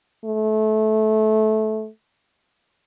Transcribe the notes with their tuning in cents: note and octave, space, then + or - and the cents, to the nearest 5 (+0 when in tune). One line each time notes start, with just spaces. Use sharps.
A3 -20